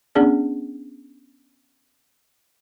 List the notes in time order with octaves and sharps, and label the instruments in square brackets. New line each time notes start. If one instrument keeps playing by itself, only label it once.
[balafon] B3 C#4 D4 G#4 D5